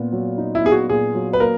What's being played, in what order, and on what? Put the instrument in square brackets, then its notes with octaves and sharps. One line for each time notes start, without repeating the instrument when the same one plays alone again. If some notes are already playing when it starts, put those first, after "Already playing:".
Already playing: [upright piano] A#2 B3
F#3
D#4
[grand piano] E4
[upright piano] B3 [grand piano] G#4
[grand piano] F#4
[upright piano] A#2 [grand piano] G#4
[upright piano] F#3
[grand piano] B4
[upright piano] A#3 [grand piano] A#4